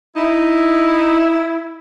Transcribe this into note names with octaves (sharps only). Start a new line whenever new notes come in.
D#4 E4